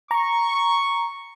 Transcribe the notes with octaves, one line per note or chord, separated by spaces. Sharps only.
A#5 C#6